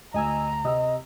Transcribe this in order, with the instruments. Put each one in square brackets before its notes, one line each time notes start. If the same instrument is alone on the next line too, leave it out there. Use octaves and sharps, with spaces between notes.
[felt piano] D2 [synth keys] D#5 G#5 E6 [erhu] A#5
[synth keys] C3 [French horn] D#5 [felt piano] D#6 E6